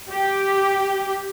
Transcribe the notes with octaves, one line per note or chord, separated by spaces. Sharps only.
G4